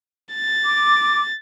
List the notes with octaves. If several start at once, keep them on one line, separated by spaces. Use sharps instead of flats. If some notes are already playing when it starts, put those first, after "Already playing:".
A6
D6